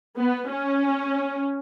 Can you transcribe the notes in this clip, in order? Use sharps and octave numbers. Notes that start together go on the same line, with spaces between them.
B3
C#4